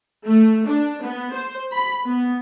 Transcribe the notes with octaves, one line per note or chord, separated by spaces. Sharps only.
A3
D4
B3
C5
B5
B3